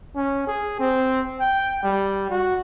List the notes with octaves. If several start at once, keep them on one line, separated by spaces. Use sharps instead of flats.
C#4
G#4
C4
G5
G3
F#4